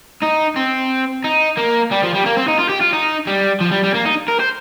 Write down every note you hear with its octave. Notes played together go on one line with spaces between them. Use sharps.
D#4
C4
D#4
A#3
G3
F3
G3
A#3
C4
D#4
F4
G4
F4
D#4
G3
F3
G3
G3
A#3
D#4
A#4
C5